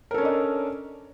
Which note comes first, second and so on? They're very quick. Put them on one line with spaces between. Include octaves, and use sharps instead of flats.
A#4 A4 C#4 D4 D#5